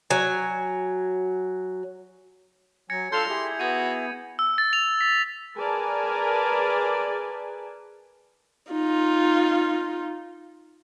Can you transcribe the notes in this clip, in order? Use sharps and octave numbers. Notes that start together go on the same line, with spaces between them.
F#3 G#5
F#3 G#5 G#6 A#6 C#7
D4 F4 A4 F5 A5 C6 G6 F7
E4 G4 G#4
B3 F#4 G#6 D#7
E6
A6
F7
B6
G#4 A#4 B4 D5 G#5 A5
D#4 F4